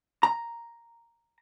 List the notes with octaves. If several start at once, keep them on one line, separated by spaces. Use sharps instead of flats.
A#5